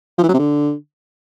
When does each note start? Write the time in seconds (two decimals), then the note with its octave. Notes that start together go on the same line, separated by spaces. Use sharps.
0.18 F3
0.23 E3
0.29 F#3
0.34 C3
0.39 D3